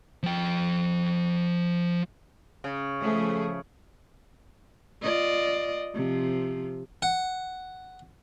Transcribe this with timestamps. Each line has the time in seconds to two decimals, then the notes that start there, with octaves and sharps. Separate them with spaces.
0.23 F3 G5
2.64 C#3
3.01 F3 A3 G#4
5.03 F4 D5 D#5
5.94 C3 F3
7.02 F#5